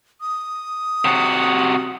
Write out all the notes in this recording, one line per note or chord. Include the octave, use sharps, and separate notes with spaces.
D#6
C3 F#4